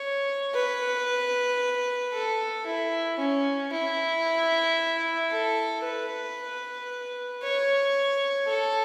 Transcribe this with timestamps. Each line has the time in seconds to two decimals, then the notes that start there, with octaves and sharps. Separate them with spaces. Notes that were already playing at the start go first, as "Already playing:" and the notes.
Already playing: C#5
0.54 B4
2.13 A4
2.66 E4
3.19 C#4
3.72 E4
5.31 A4
5.84 B4
7.43 C#5
8.48 A4